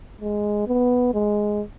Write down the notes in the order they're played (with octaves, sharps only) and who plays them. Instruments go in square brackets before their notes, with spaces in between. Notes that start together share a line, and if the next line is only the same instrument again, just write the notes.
[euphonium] G#3
B3
G#3